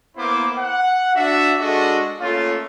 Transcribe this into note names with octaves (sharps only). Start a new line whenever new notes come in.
A#3 B3 E4 C5 D6
F#5
D4 F#4 E5
G#3 D4 F#4 A4 D#5
A3 A#3 C#4 F4